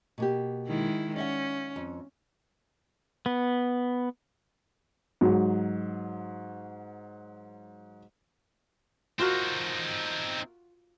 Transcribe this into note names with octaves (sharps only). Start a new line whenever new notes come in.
B2 A#3 G4
D#3 G#3 E4
C#4 D5 E5 F#5
F2
B3
G#2 F#3
C4 D#4 F4 F#4 A#4